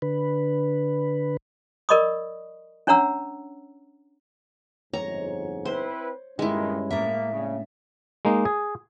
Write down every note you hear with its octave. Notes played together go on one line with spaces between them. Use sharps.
D3 B4
A#4 D5 D#5 B5 C#6 D#6
C#4 D4 C#5 F#5 A#5 E6
G1 F2 G#2 C#5 A#5
C4 E4 B4 C5
G2 A#2 D#3 G#3 C#4 E4
A2 A#3 E5
C#3 A#3 C#4 D4
G#3 A#3 D#4
G#4